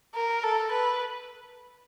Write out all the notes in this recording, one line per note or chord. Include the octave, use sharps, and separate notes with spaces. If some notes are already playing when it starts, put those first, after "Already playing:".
A#4
A4
B4